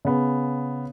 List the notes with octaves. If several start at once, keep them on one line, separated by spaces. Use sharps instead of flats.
C#3 B3